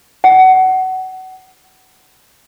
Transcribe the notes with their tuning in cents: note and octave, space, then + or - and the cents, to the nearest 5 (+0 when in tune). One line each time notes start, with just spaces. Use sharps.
F#5 +25